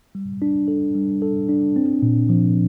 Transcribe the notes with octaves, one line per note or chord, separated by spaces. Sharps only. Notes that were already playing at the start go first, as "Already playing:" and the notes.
G3
D4
A4
G3
A4
D4
C4
A#2
F3